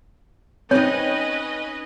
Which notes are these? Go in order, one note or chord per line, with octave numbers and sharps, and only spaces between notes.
C4 C#4 D#4 B4 C#5 D#5 G#5